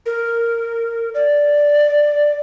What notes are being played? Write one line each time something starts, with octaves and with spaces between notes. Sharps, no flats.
A#4
D5